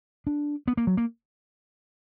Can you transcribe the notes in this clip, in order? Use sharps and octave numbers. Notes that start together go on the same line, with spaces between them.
D4
B3
A#3
F#3
A#3